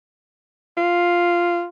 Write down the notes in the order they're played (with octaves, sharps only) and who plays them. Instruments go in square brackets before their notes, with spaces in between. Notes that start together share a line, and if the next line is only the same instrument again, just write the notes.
[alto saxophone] F4